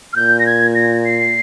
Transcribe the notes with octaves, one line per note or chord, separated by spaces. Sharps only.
F6
A#2 G6
A#6
G#6
A#6
C7